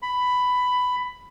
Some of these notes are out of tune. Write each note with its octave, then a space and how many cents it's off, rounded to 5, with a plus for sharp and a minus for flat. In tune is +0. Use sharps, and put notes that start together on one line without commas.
B5 +10